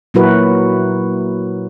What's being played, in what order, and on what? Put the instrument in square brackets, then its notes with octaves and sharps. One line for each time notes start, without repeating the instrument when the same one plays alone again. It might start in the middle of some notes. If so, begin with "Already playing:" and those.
[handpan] A#2 F#3 E4 F#4 A#4 B4